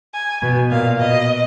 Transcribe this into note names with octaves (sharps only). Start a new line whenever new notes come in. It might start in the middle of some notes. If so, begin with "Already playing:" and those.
G#5
B2
A#2 F5
B2 D#5